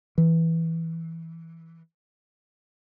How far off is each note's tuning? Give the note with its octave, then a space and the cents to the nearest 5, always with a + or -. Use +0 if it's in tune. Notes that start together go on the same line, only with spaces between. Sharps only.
E3 -5